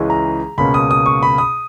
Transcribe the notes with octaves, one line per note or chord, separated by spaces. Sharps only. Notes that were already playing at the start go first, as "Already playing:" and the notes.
Already playing: C#2 C#3 E3 G#3 C#4
A#5
C#2 B2 A#3 C#4 B5
D#6
D#6
C#6
B5
D#6